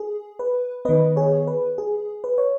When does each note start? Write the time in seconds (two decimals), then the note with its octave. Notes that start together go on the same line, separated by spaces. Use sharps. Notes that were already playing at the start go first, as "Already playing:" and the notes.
Already playing: G#4
0.39 B4
0.85 D#3 B3 B4 D#5
1.16 G#4 C#5
1.47 B4
1.78 G#4
2.24 B4
2.38 C#5